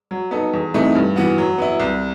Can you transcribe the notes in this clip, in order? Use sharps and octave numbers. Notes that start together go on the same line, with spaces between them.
F#3
B3 D#4 A4
E2
C3 E3 A3 D#4
G2
E3 B3 F#4
F#3
B3 E4
C2